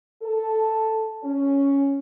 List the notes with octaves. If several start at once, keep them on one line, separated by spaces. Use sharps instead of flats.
A4
C#4